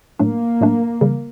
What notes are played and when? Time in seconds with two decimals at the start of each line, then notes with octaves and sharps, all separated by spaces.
0.19 A2 F#3 A3 A#3 D4
0.61 A2 F#3 A3 D4
1.01 C#3 E3 G3